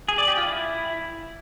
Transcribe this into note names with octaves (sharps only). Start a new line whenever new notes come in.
G#4
D5
G4
F4
E4